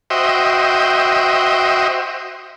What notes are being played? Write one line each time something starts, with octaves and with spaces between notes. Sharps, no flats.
F#4 C5 D#5 E5 G5